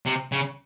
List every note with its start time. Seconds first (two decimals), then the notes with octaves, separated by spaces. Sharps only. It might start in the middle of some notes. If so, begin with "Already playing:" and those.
0.06 C3
0.32 C#3